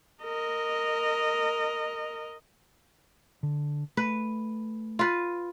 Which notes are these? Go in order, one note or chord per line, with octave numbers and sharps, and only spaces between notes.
A#4 D#5
D3
A3 B4
F4 B4